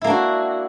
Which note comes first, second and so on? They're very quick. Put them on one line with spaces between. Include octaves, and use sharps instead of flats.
E4 A#3 D4 F#4